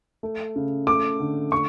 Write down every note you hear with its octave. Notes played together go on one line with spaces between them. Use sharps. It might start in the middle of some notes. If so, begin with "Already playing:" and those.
A3
C#3
A3 D6
D3
A3 C#6